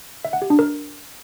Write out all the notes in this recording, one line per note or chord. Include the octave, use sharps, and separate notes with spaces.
E5
F#5
G4
D4
A#4